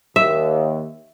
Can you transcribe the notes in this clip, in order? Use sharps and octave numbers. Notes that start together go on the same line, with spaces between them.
D#2 E5